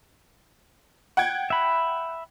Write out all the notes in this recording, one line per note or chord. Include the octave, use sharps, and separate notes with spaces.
F#5 G5 G#6
E5 B5